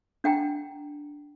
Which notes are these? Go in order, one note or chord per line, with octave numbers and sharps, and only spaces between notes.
D4 F#5 G5 A#5